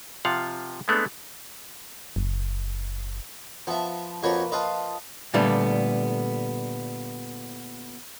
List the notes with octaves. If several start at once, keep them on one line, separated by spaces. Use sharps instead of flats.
C3 F3 F4 F5 F#5
G#3 A3 B3 C4 D4
F#1
F3 B3 E5 A5
F2 A#3 F#4 B4 C#5
F4 B4 D#5 F5 A5
A#2 D3 G3 A3 B3